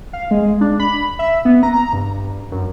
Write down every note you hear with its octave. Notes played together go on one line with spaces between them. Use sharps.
F5
G#3
D4
B5
E5
B3
A#5
G2
F#2